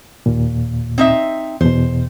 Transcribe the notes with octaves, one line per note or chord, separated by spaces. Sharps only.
D#2 A#2
C4 D#4 E5
E2 B2 C5